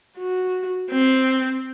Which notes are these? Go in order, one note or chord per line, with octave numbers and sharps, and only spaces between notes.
F#4
C4